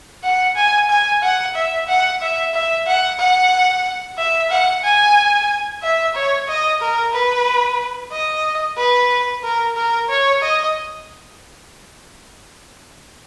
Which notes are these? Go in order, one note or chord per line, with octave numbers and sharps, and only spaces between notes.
F#5
G#5
G#5
F#5
E5
F#5
E5
E5
F#5
F#5
E5
F#5
G#5
E5
C#5
D#5
A#4
B4
D#5
B4
A#4
A#4
C#5
D#5